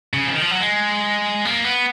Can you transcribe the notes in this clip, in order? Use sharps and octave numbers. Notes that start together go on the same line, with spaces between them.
C#3
F3
D#3
F3
F#3
G#3
A#3
B3